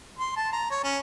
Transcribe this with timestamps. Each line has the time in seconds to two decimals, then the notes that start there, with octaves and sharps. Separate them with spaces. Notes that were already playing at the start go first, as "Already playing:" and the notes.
0.19 C6
0.37 A5
0.53 A#5
0.71 C#5
0.84 C#4